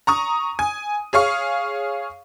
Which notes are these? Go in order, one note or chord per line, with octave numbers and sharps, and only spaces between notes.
A#5 C#6 D#6
G#5
G#4 C#5 F5 C#6